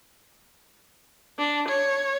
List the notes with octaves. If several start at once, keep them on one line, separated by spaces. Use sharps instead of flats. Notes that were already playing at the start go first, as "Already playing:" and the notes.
D4
C#5